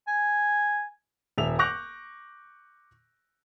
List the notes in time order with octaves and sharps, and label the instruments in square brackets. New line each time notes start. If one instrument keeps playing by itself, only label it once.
[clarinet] G#5
[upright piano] D#1 E5 F7
C#6 D6 F#6 G6 A#6 F7